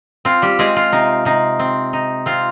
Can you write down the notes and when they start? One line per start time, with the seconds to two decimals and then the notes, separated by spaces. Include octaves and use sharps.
0.25 C4 F4
0.42 G3 G4
0.59 G#3 C4 G#4
0.76 F4
0.92 C3 D#4
1.25 C3 D#4
1.59 C4
1.93 D#4
2.26 C4 F4